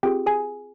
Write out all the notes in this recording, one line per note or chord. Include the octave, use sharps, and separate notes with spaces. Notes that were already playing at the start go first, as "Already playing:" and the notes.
C4 F4 G4 G#4 G5
G#4 G#5